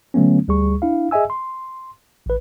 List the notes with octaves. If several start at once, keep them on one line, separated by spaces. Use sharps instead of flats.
D3 F#3 A3 B3 C#4
D2 G3 G#4 C#6
D4 E4 F5
G#4 D#5 E5 G#5 E6
C6
A1 B4